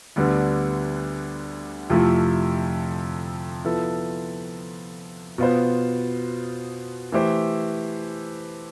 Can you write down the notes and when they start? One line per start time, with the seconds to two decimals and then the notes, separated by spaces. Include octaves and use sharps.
0.16 D2 D3 G3 B3 D4
1.90 F2 C3 F3 A3 E4
3.65 F3 B3 E4 A4
5.38 B2 B3 F4 C5
7.12 E3 A3 E4 G4 C5